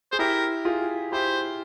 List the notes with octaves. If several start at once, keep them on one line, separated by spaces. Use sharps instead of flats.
G#4 C5
E4 G4 A#4
F4 G#4
E4 G4 C5